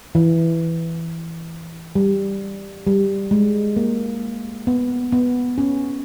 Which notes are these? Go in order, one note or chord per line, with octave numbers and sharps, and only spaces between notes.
E3
G3
G3
G#3
A#3
B3
B3
C#4